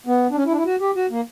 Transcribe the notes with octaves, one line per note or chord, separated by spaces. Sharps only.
B3
D4
C#4
E4
D4
E4
F#4
G4
F#4
A#3